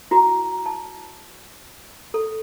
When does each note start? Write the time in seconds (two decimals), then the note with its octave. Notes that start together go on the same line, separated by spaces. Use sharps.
0.11 E4 F#4 A#5
0.66 A5
2.14 A4